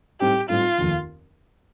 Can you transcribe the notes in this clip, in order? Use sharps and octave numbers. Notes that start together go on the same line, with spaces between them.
A2 G3 C4 D#4 G4
A2 G3 C4 D#4 F4
F1 D#2 D#3